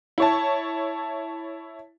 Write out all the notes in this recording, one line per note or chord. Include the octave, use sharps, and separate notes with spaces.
E4 C#5 A5